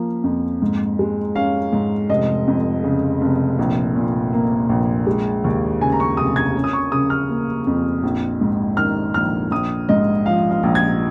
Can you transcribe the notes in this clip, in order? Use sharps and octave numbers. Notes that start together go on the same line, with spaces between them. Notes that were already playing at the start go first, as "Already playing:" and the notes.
Already playing: F3 A#3 C#4
F2
G#2
G#3
C#4 F5
G#2
F1 D#5
F2
C#3
F1
A#1
A#2
A#3
A#1
G#3
D#2
C#3 G#5
A#5
C#6
F1 D#6
G#6
C#4
D#6
C#6
C#3 D#6
F6
A#3
F2
A#1
G#2
D#3 F6
A#1 F6
A#1 D#6
G#2 D#5
F3 F5
F5
A#1
G#6